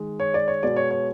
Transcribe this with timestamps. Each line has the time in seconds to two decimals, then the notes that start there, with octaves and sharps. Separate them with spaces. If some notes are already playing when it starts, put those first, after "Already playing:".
Already playing: D#3 G#3
0.20 C#5
0.34 D5
0.48 C#5
0.63 B2 G#3 D5
0.76 C#5
0.91 C#5